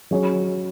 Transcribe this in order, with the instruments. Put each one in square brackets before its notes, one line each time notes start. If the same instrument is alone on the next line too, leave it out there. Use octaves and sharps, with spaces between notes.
[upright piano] F#3 C#4 G#4 C#5